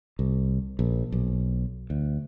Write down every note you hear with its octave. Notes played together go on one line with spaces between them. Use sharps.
C2
A#1
B1
D2